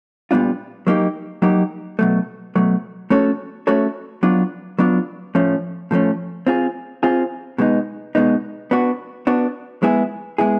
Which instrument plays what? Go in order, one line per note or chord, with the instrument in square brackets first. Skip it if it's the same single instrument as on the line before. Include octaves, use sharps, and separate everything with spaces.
[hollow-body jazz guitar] A#2 G3 B3 D4 F4
F#3 A#3 D#4 G4
F#3 A#3 D#4 G4
B2 F#3 A3
B2 F#3 A3
A3 C#4 F#4 A4 C#5
A3 C#4 F#4 A4 C#5
F#3 B3 D4 F4
F#3 B3 D4 F4
A2 F3 A3 C#4
A2 F3 A3 C#4
C4 F4 G#4
C4 F4 G#4
B2 G#3 B3 D#4
B2 G#3 B3 D#4
B3 D4 F#4
B3 D4 F#4
G#3 B3 E4 G#4
G#3 B3 E4 G#4